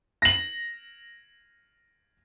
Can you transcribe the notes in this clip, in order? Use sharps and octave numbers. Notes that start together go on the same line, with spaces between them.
A#6 F#7